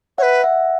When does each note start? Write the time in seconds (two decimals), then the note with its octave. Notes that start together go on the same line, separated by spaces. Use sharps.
0.18 B4 C#5 E5 F#5
0.44 E5 F#5